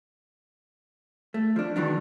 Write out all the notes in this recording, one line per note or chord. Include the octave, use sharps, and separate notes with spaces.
A3
F3 D4
D#3 E3 F#3 D4